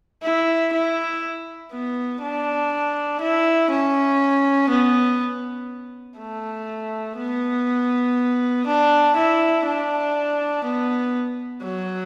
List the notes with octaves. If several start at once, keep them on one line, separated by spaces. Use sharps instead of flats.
E4
E4
B3
D4
E4
C#4
B3
A3
B3
D4
E4
D4
B3
F#3